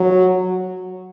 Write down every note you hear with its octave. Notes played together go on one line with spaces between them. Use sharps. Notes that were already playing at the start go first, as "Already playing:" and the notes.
Already playing: F#3